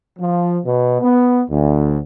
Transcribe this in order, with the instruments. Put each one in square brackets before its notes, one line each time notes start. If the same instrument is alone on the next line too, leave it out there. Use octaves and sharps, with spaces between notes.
[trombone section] F3
B2
B3
D2